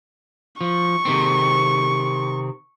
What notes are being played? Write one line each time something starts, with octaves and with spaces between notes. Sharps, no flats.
F3 C#6
C3 D#3 C4